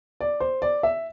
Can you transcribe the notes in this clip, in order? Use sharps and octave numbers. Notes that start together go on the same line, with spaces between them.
D5
C5
D5
E5